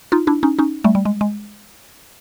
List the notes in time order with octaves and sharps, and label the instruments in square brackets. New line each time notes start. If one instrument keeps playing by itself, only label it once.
[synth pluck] D#4 F4
D4 E4
C#4 D#4
C#4 D#4
G3 A3
G3
G#3
G#3